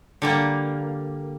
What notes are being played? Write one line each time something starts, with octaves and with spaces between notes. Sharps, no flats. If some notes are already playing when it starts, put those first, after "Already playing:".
D3 G3 A#3